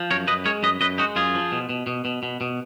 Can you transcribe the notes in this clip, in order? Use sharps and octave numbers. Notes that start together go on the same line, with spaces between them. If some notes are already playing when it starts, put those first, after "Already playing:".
Already playing: F3
F#2 A#4 C#5
F#2 B4 D#5
G#3 A#4 C#5
F#2 B4 D#5
F#2 B4 D#5
G#3 D#4 F#4
F#2 F4 G#4
F3
B2
B2
B2
B2
B2
B2